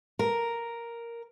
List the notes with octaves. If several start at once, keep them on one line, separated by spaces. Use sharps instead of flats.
A#4